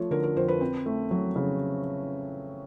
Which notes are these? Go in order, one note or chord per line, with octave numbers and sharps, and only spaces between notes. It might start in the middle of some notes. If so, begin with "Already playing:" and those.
Already playing: F3 A3 C#5
D3 A#4
A#4
F2 C5
B4
C4
A3
F#3
C#3